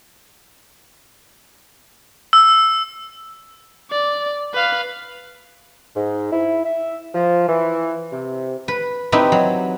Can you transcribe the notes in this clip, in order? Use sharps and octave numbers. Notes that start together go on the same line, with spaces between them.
E6
D5
B4 F5
G#2
E4
E5
F3
E3
C3
B4
C4 D#4 E4 G4 B4
F#3